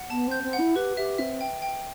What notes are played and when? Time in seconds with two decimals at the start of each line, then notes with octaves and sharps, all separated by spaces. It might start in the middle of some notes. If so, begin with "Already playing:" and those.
Already playing: F#5
0.10 B3 A5
0.27 C4 G6
0.43 C4
0.53 F#5
0.58 E4
0.75 G4 B4
0.97 G4 E5
1.18 C4 E5
1.41 G5
1.62 G5